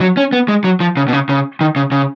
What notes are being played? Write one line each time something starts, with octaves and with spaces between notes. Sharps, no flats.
F#3
C#4
B3
G#3
F#3
F3
C#3
B2
C#3
C#3
D#3
C#3
C#3